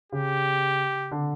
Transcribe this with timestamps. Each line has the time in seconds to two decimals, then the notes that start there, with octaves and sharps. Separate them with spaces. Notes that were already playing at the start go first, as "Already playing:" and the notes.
0.12 C#3 G4
1.12 D3